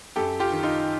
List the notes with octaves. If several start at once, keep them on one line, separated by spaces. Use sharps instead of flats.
F#2 G4 A4
F4 G4
D#3
D#4 F4